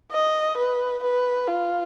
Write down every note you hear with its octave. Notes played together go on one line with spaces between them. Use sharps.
D#5
B4
B4
F4